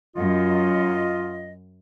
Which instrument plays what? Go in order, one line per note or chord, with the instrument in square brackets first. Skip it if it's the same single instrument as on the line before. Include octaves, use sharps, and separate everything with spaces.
[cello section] F#2 [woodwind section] F4 D#5